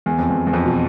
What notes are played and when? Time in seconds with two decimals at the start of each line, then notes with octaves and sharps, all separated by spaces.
0.06 E2
0.18 F2
0.30 E2
0.47 E2
0.53 F2
0.65 B2